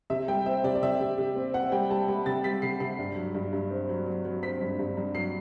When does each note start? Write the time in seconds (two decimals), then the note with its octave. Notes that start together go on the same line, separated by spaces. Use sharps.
0.10 C3 E5
0.28 G3 G5
0.46 C4 E5
0.64 C3 D5
0.75 D5
0.82 C3 E5
1.01 C3
1.18 C3
1.36 C4
1.54 C4 F#5
1.72 G3 G5
1.91 G3 A5
2.08 G3 B5
2.26 C3 A6
2.44 G3 B6
2.62 C3 C7
2.80 C3 C7
2.99 G2
3.16 F#3
3.35 G2
3.53 G2
3.71 C4
3.89 F#3
4.06 F#3
4.25 F#3
4.43 C4 B6
4.61 G2
4.79 G2
4.97 G2
5.15 F#3 C7